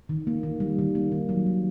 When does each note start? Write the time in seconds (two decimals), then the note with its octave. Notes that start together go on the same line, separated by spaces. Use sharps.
0.09 D#3
0.27 A#3
0.43 D#3
0.60 G3
0.79 D#3
0.95 A#3
1.12 D#3
1.29 F#3
1.47 D#3